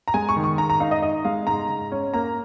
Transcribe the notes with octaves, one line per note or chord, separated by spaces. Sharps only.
A#5
G#3 G#5
C#6
D#3
C#6
G#2 A#5
A#5
D#4 F5
D#5
D#4 D#5
G#3 F5
G#2 A#5
G#2
C#4
A#3 A#5